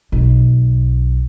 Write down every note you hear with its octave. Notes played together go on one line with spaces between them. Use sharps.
B1